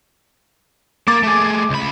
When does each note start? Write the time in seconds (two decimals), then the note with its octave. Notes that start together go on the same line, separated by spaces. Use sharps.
1.08 A#3 D6 A6
1.23 A3 G#4
1.70 C#2 B5